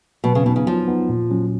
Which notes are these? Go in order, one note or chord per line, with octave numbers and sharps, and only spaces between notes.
B2 F#3
C#3
B2 B3 D#4
C#3
F3 F#3
B3 D#4
A#2
F#3 C#4